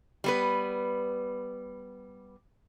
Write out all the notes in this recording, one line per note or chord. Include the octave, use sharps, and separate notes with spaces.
G3 B3 B4